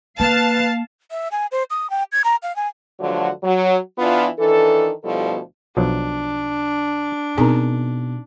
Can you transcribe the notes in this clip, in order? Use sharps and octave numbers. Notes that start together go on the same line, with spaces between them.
A#3 B4 F5 A5
E5
G#5
C5
D#6
G5
G#6
A#5
F5
G#5
G2 D3 F3 F#3 A3 F#4
F#3
E3 B3 D4 F4
D#3 E3 D4 A4
D2 B2 F3 G3 E4 A4
B1 F3 F#3 D4
B2 C4 D#4 G#4 A#4 A#5